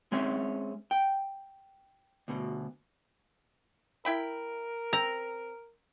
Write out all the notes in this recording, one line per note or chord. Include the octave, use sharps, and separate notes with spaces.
G#3 C4 C#4 E5
G5
D2 B2
E4 A#4 G5 B5
C4 A#5